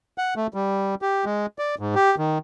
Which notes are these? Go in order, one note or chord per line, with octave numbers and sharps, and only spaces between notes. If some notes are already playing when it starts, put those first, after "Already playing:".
F#5
A3
G3
G4
G#3
D5
G#2
G4
D#3